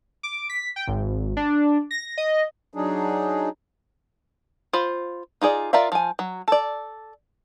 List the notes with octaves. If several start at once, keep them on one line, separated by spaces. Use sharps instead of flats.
D6
B6
G5
G#1
D4
A#6
D#5
F#3 D4 D#4 G#4
F4 C5 B5
D#4 F4 G#4 D5
F4 A#4 D5 E5 F5
F3 G#5
F#3
A4 D5